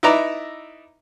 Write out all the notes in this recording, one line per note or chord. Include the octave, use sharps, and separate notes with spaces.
D#4 E4 B4 D5 E5 A#5